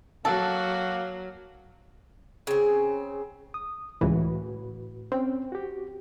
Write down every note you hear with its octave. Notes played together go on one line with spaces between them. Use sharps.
F#3 A#3 F#4 A4
C#3 C4
D#6
C#2 A2 E3 F#4 B4
C4 C#4 G5
F#4 G4